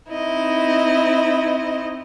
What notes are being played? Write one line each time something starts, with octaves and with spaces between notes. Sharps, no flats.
C4 D#4 E4 D#5